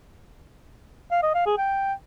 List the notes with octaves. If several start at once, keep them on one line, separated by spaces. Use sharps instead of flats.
F5
D#5
F5
G#4
G5